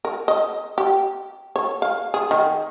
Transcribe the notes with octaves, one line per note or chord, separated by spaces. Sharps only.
A#4
D#5
G4
C#5
F5
G#4
D#3